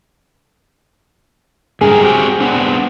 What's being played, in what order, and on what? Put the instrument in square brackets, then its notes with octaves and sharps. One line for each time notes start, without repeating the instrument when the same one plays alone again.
[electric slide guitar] G#2 G3 A#4 [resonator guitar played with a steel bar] G#4
[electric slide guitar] C4 F#4 G4
B3 C4 D4